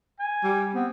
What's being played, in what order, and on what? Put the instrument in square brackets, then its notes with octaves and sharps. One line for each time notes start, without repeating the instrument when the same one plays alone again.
[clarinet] G#5
[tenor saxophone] G3
[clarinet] B3 [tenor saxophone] C4